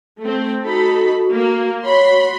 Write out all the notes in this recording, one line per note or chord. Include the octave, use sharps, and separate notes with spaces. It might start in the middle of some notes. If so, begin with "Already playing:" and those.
A3 C4
D#4 F#4 A4 B5
A#3
F#4 C#5 B5 C6